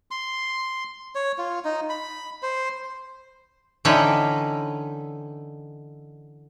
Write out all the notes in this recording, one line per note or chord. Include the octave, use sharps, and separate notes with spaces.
C6
C#5
F4
D#4
B5
C5
D3 E3 C#4 D#4 B4 G5